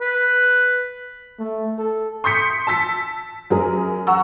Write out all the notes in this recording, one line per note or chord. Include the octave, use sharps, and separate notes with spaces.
B4
A3
A4
C6 D#6 G6 B6 C#7
A5 E6 B6
F#2 G#4 A#4
F#5 A#5 C#6 E6